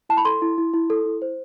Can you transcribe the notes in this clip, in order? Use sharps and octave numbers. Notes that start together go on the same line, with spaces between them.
E4 A5
B5
A4 C6
E4
E4
E4
A4
E4
C5